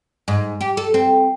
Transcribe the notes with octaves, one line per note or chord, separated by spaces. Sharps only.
G#2
G4
A4
C4